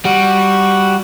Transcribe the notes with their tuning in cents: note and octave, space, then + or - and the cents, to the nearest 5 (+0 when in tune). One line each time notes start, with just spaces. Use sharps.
G3 -5 F#4 +0